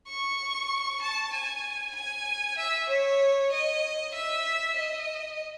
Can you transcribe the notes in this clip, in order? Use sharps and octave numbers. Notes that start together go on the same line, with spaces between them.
C#6
A5
G#5
G#5
E5
C#5
D#5
E5
D#5